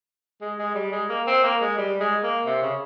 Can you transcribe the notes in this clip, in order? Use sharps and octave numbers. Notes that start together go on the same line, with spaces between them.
G#3
G#3
G3
G#3
A#3
C4
A#3
G#3
G3
G#3
A#3
C3
C#3